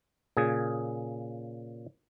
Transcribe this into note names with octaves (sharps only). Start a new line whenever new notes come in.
A#2 C#3 G#4